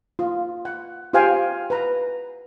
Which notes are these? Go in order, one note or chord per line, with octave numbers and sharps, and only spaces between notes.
F4
F#5
F4 G4 C5 F5 G5 G#5
B4 A#5